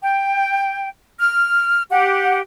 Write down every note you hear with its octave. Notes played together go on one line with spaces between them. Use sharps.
G5
F6
G4 F#5